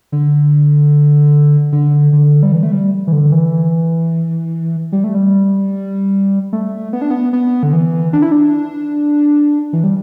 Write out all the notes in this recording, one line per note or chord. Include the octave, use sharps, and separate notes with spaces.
D3
D3
D3
G3
E3
A3
G3
E3
D3
E3
G3
A3
G3
A3
B3
D4
B3
B3
D3
E3
D4
E4
D4
E3
G3